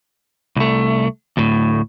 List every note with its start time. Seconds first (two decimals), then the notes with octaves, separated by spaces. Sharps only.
0.56 C2 A3
1.37 D2 A2